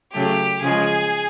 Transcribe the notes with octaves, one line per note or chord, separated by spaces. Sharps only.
C#3 F#3 A3 G4
C#3 F3 G#3 G#4